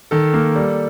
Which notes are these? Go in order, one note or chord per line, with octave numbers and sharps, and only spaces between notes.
D#3 A4
A#3
G3